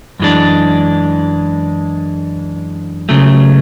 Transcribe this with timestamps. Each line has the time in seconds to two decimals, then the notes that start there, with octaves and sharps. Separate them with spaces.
0.20 F#2 E3 G#3 D4
3.09 C#2 C#3 F#3 A3